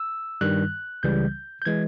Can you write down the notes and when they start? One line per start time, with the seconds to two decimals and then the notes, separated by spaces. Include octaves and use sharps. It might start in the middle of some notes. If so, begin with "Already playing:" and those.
Already playing: E6
0.41 G2 D#3 G3 F#6
1.03 C#2 C#3 E3 G3 G6
1.62 G6
1.65 E3 G#3 G#6